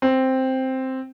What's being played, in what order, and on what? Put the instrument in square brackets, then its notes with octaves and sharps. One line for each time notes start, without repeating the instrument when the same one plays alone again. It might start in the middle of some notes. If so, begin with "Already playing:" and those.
[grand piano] C4